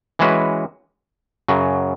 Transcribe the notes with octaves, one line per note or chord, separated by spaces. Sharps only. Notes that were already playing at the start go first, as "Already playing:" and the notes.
E3 G#3 C#4 F#4 B4
F#2 C#3 F#3